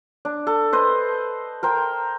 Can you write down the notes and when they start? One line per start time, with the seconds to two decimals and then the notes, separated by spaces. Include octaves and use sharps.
0.25 D4
0.47 A4
0.73 B4 C5 D#5
1.63 A#4 C5 G5